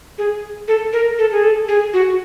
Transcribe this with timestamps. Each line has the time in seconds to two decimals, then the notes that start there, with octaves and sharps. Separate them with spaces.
0.18 G#4
0.68 A4
0.93 A#4
1.18 A4
1.32 G#4
1.43 A4
1.68 G#4
1.93 F#4